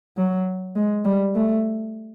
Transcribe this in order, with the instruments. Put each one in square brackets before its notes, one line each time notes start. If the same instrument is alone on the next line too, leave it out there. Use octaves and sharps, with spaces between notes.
[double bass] F#3
G#3
G3
A3